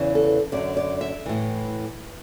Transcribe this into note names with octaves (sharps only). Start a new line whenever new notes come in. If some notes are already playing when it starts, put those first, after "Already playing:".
Already playing: E2 C#3 E3
A4
F#2 D3 D5
D5
E5
A2 E3